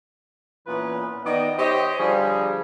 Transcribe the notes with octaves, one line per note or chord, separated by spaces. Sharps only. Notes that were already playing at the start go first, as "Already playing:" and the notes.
A#2 E3 B3 C#4 B4
D#3 B3 D5 D#5
G4 C5 C#5 D#5
D3 F3 G3 G#4